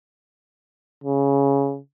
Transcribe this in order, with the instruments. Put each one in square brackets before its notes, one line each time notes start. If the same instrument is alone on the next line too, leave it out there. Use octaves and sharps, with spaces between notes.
[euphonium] C#3